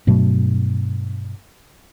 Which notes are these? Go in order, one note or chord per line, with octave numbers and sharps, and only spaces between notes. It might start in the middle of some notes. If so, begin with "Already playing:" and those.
G2 B2 F#3 A3